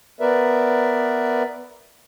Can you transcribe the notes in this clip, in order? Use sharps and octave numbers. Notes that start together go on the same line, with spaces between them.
B3 A#4 B4 D5 E5